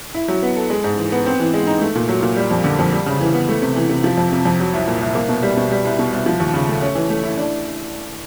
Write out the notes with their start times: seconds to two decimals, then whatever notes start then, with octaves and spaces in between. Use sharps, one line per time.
0.15 E4
0.28 F#3
0.42 B3
0.56 A4
0.70 G#3
0.84 G#2
0.97 E3
1.12 B3
1.26 C4
1.40 E3
1.54 G#3
1.67 D#4
1.82 A3
1.95 A#2
2.09 F#3
2.22 A#2
2.36 G3
2.51 F2
2.64 D3
2.79 F2
2.92 G3
3.06 C#3
3.21 E3
3.34 B3
3.49 A3
3.62 C3
3.76 E3
3.89 C3
4.04 F3
4.18 F2
4.32 C3
4.46 F2
4.60 F#3
4.74 C2
4.87 A#2
5.01 C2
5.15 A#3
5.29 B2
5.43 G3
5.57 B2
5.71 G3
5.85 C2
5.99 B2
6.13 C2
6.26 F3
6.40 D#2
6.54 C#3
6.69 A3
6.82 C#4
6.95 E3
7.10 A3
7.23 E4
7.37 D4